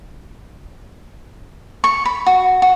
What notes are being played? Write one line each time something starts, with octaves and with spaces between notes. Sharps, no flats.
C#6
B5
F#4
F#4